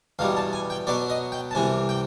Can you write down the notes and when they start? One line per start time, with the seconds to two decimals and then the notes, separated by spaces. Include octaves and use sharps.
0.19 E2 B2 G3 F5
0.37 A5
0.53 G#5
0.70 G5
0.87 B2 F#3 B3 D5
1.10 D#5
1.32 G5
1.51 A5
1.55 C2 C3 E3 G#5
1.89 G5